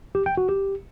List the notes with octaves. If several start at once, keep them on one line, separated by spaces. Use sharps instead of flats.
G4
G5
F#4
G4